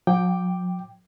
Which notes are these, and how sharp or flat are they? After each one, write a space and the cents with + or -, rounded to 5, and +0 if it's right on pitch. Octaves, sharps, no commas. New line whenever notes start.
F#3 -45 G5 +0 D6 +5